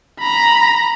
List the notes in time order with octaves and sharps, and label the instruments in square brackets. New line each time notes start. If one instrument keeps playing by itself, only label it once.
[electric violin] A#5 B5